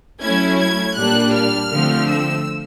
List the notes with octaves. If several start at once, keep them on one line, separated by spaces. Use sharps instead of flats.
F#3 A3 C#4 E4 G#6
G#6
A#2 G3 A#3 D4 F#6
F6
D3 F3 A3 C4
E6